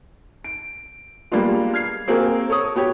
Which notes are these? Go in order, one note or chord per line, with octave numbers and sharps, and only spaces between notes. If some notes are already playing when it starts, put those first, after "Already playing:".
D7
G3 G#3 A#3 B3 D4 F4
F6 G#6 C7
A#3 C4 F#4 G#4 A#4
A4 C#5 C#6 D#6
B3 F#4 G4 C#5